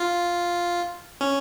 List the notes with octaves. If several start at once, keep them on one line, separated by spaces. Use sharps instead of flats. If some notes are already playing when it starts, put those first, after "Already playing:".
Already playing: F4
C#4